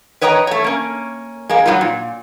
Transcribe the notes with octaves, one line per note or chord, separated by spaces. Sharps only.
B4 C#5 D#5 G5 A#5
A3 C#5
A#3 C#4
G#3 A#3
F#3 G3 D#4 F4
A#2